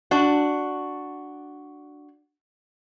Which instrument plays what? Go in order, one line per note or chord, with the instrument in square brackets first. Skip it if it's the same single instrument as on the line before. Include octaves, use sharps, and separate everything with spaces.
[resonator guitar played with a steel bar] D4 F#4